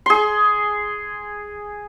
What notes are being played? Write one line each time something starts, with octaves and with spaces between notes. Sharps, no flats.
G#4 C6